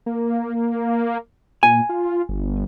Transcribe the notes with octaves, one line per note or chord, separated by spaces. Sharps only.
A#3
A#2 G#5
F4
G1